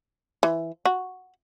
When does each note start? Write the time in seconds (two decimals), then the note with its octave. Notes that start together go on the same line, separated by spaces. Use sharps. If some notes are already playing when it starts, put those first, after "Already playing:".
0.43 E3
0.85 F#4